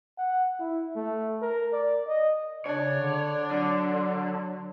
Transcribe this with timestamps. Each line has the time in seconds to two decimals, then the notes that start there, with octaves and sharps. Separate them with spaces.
0.18 F#5
0.60 E4
0.96 A3
1.42 A#4
1.73 D5
2.07 D#5
2.66 C#3 D4 C#5
3.00 D3
3.51 D3 F#3